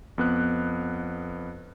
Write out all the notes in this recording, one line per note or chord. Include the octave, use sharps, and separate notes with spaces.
F2 B3 F#6